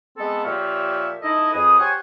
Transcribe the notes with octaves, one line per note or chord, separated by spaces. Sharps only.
G#3 B3 C4 A4
A#2 F3 G4 C#5 E5 F5
D#4 E4 A4 D#5
F2 G#4 B4 D#6
G4 C5 C#5 F#5 G#5